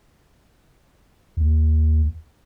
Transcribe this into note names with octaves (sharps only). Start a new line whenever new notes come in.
D#2